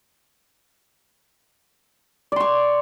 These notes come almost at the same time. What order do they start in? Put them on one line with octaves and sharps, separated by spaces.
D5 C6 C#6